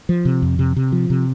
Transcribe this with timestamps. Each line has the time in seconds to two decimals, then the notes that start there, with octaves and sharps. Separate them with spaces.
0.09 F3
0.25 C3
0.42 F2
0.59 C3
0.76 C3
0.92 F3
1.10 C3